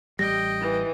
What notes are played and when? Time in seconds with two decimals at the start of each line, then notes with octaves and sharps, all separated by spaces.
0.19 A1 G3 D#5 G5 A#6
0.61 E3